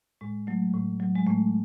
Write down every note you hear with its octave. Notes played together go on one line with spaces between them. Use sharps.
A2 G#3
F#3 A3
A2
F#3
G#3
A2 A3